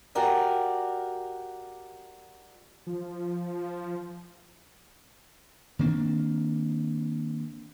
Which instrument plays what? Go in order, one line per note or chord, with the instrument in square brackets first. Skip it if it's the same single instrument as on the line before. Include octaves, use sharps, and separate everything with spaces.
[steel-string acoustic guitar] F#4 G4 A#4 D5 F5 G#5
[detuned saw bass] F3
[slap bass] D#3 A#3 C4 D4